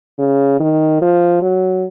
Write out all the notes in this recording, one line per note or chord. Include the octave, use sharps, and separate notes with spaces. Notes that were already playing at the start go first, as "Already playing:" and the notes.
C#3
D#3
F3
F#3